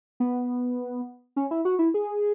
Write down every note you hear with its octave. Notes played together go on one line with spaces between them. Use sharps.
B3
C#4
E4
F#4
E4
G#4